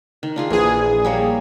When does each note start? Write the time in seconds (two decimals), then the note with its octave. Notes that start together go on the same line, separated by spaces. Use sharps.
0.23 D#3
0.36 D4 F4 G#4
0.50 A#1 E3 G#4
1.05 G3 A#3 C#5